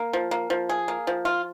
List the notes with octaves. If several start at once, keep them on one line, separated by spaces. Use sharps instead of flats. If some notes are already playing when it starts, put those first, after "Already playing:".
Already playing: A#3
F3
A#3
F3
G#4
A#3
F3
F4